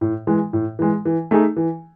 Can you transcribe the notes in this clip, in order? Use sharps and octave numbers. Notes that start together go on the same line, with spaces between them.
A2
E3 G#3
A2
E3 G#3
E3
A3 D#4 G#4
E3